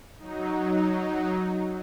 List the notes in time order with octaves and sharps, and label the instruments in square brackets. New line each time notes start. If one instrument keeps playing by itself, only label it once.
[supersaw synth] F#3 D#4